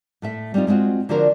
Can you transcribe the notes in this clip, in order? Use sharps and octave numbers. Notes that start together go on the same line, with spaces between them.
A2 A3 E5
G3 C4 C#4 D#4 F4
G#3 C4 D#4 F4 F#4
D3 F3 D4 F#4 A#4 C5